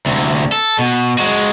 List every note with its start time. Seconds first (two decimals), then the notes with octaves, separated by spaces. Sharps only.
0.06 D2 C3
0.52 A4
0.79 B2
1.18 G#3 F#4